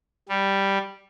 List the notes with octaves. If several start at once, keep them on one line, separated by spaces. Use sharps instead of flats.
G3